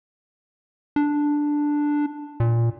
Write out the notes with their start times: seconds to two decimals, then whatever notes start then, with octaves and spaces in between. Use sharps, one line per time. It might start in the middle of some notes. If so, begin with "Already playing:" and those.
0.96 D4
2.40 A#2